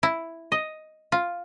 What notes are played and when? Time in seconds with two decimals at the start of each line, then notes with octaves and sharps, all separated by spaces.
0.03 E4
0.52 D#5
1.12 F4